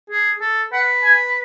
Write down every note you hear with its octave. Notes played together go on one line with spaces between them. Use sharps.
G#4
A4
B4 F#5
G#5